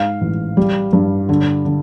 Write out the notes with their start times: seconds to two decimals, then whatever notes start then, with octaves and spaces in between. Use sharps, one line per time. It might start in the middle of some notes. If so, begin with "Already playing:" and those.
Already playing: G#2 F5
0.21 A1
0.57 G3
0.93 G2
1.29 D3
1.65 D3